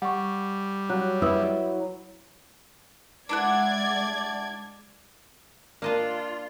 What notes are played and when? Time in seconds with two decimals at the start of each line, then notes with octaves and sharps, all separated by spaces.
0.02 G3 F#5 C#6
0.90 F#3 F#6
1.22 E4 B4 D#6 E6
3.29 G#3 D4 E4 D5 F#5 G#6
5.82 A#3 D4 F4 D#5 A5